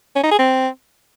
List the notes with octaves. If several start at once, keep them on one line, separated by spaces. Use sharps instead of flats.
C#4
D#4
G#4
C4